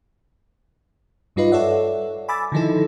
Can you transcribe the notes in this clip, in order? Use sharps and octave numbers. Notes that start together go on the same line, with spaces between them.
G2 G3 D#4 F4 B4 D#5
A4 C#5 D5 E5 F#5
G#5 B5 D6 E6 A6
D3 D#3 F3 D#4 E4 A4